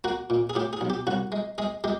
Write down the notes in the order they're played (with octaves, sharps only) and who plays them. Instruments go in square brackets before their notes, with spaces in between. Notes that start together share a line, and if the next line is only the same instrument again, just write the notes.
[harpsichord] A#3 F#4
A#2
G#4
A2 G4
G#4
B1
G4
C2 F#4
G#3
G#3 G#4
G#3 G4